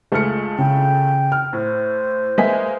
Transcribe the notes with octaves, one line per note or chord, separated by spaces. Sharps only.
C#2 G#3 A3 F6 C#7
C#3 G5
F6
A2 C5
G#3 A#3 B4 E5 G#5 B6